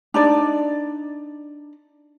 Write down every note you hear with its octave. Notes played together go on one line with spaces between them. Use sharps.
D4 D#4 D5